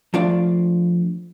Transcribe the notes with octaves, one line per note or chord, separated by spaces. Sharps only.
F3 A3 D4 F4 D5 F5